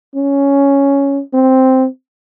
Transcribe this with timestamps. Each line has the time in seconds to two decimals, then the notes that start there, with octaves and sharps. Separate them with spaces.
0.16 C#4
1.34 C4